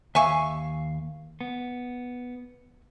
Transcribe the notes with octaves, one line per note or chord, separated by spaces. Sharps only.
D#2 E5 F5 G#5 C#6
B3